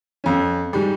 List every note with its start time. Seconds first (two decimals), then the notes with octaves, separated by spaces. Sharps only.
0.24 F2 C#4
0.73 G#2 G3